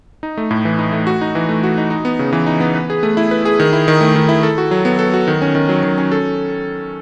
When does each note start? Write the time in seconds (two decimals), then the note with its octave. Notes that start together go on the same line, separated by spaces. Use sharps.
0.23 D#4
0.37 A3
0.51 A2
0.65 E3
0.79 D#4
0.92 A3
1.07 F#4
1.21 D#4
1.35 E3
1.49 A3
1.64 F#4
1.78 D#4
1.91 D#4
2.05 B3
2.19 C#3
2.33 E3
2.46 D#4
2.60 B3
2.74 B4
2.90 G#4
3.03 A3
3.17 E4
3.31 B4
3.45 G#4
3.60 D#3
3.73 E4
3.88 D#3
4.01 A3
4.16 D#3
4.29 E4
4.43 A4
4.58 F#4
4.71 F#3
4.85 B3
4.99 A4
5.14 F#4
5.28 D#3
5.42 C#4
5.55 D#3
5.69 F#3
5.83 D#3
5.98 C#4
6.12 A4